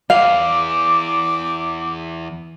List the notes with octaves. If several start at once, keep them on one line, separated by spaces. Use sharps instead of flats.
E2 E3 F5 D6